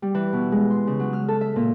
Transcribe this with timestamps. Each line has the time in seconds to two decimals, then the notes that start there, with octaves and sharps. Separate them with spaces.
0.02 G3
0.15 E3
0.33 B2
0.52 G#3
0.70 C6
0.87 C#3
0.99 F#3
1.13 F6
1.28 A4
1.41 E5
1.56 A#2